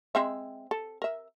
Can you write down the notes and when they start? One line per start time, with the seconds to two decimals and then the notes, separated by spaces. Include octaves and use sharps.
0.15 G#3 C4 E5
0.71 A4
1.02 A#4 E5